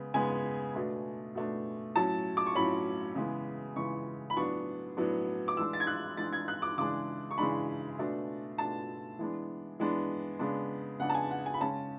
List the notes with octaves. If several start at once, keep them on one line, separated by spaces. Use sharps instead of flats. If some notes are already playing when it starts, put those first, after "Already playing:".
Already playing: C#3 G#3 B3
C#3 G#3 B3 G#5
B2 A3 D4
B2 A3 D4
A2 F#3 C#4 A5
D6
C#6
A2 F#3 C#4 B5
C#3 E3 G#3 B3
C#3 E3 G#3 B3 C#6
B5
A2 F#3 B3 D4 C#6
A2 F#3 B3 D4
D6
E3 G#3 D4 E6
A6
G#6
F#6
E3 G#3 D4 A6
G#6
F#6
D6
C#3 E3 G#3 D4 D6
C#6
C#3 E3 G#3 D4 B5
B2 A3 D4
B2 A3 D4 A5
E3 G#3 B3 D4
E3 G#3 B3 D4
C#3 G#3 B3 D4
C#3 G#3 B3 D4 F#5
A5
G#5
F#5
G#5
B5
C#3 G#3 C#4 A5